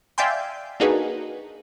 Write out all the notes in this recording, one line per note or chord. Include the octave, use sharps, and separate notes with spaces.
D5 E5 F5 G5 G#5 C6
A#3 D4 D#4 F#4 G#4 B4